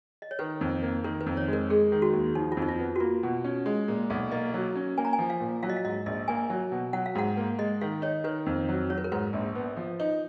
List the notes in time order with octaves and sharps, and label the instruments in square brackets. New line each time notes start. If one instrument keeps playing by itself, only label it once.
[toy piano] D#5
C#5
[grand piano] D#3 [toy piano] B4
[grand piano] F2
A#3
[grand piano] D#3 [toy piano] A#4
[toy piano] B4
[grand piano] F2
[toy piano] C#5
[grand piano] G#3 [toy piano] A#4
[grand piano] G#3 [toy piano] G#4
[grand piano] D#3
[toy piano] F#4
[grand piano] D#2
[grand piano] F3 [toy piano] D#4
[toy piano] F4
[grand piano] F2
[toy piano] D#4
F4
[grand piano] B3
[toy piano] F#4
[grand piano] A#3 [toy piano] F4
[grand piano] B2
C#4
G#3
A#2
B1
[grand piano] A#3 [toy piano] D#5
[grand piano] F#3
C#4
[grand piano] A#3 [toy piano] G#5
[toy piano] A#5
G#5
[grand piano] F3
[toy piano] F5
[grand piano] A#2
[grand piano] F#3 [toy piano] F5
[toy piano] D#5
F5
[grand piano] G#2 [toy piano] D#5
[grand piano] A#1 [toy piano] D#5
[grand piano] A#3 [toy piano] G#5
[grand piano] F#3
B2
[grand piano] F#3 [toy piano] F#5
[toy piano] F5
[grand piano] G#2 [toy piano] F#5
[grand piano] A#3
[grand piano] G#3 [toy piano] D#5
[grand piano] D#3 [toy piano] F5
[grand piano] D#4 [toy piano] C#5
[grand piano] D#3 [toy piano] B4
[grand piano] F2
F#3
[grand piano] F#3 [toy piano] C#5
[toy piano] B4
A#4
[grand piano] G#2 [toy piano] B4
[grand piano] A#1
B3
F3
D#4